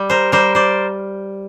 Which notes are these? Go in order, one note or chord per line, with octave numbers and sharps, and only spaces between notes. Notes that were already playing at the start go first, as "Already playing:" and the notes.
Already playing: G3
A#4 C5
G3 A#4 C5
C5 D5